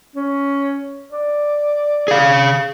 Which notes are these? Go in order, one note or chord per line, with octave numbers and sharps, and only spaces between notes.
C#4
D5
G#4 F5